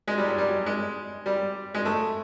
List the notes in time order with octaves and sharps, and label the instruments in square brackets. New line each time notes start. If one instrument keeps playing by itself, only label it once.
[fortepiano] G#3
G3
F#3
G3
G#3
G3
G#3
A3